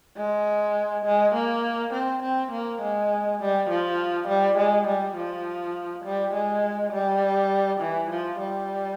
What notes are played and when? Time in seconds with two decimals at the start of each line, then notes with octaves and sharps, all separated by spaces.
0.17 G#3
1.05 G#3
1.35 A#3
1.93 C4
2.23 C4
2.52 A#3
2.81 G#3
3.40 G3
3.70 F3
4.28 G3
4.58 G#3
4.87 G3
5.16 F3
6.05 G3
6.34 G#3
6.92 G3
7.80 E3
8.10 F3
8.39 G3